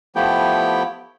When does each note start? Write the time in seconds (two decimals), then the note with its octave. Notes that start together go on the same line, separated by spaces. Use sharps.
0.16 F3 A3 B3 E4 G4 G5